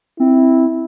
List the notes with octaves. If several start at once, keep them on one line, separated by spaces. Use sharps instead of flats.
C4 E4